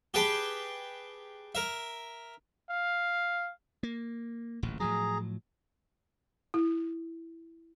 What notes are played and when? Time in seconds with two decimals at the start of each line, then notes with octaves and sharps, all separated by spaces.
0.14 G4 G#4 B4 G5 A5
1.55 A#4 E5
2.70 F5
3.83 A#3
4.63 D1 A1 A#2
4.80 A2 F3 F#3 G#4 A#5
6.54 E4